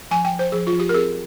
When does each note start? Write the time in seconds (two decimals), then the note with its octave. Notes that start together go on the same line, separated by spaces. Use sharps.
0.11 F3 G#5
0.25 G5
0.32 F3
0.39 C5
0.52 F3 G#4
0.67 F4
0.73 F3
0.80 G4
0.89 A#4
0.93 C4 G#4